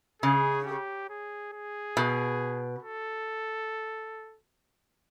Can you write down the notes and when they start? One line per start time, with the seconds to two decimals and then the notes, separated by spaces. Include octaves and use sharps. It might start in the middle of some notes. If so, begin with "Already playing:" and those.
0.22 C#3 G#4
0.66 G4
1.10 G#4
1.53 G#4
1.97 B2
2.83 A4